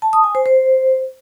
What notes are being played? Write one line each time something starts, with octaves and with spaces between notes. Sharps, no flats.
A5
D#6
G#5
C5
C5